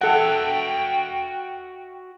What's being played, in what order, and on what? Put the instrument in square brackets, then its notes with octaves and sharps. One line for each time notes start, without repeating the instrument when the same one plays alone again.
[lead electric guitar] F#4 E5 [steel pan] A4 F#5 [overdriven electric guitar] G5